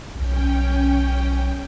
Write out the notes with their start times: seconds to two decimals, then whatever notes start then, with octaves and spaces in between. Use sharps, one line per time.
0.15 B1 C#4 G5